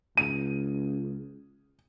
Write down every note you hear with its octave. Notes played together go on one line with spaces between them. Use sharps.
C#2 D#7